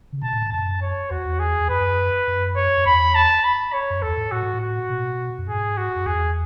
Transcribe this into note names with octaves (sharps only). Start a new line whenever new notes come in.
C#3
B2 A5
A2
G#2
F#2 A5
C#5
E2 F#4
E2
G#4
E2
F#2 B4
F#2
C#5
F#2
E2 B5
A5
B5
C#5
F#2
E2 A4
G#2
A2 F#4
G#2
A2
F#4
B2
F#2
G#2 G#4
F#4
F#2
E2 G#4